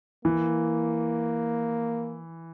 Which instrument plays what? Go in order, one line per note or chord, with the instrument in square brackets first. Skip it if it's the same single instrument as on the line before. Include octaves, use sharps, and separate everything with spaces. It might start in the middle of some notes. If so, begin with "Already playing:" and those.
[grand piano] E3 [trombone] A#3